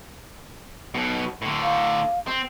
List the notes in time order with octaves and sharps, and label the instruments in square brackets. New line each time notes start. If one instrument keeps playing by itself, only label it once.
[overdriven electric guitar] B1 B2
A2 D3
[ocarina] F5
[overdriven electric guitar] C4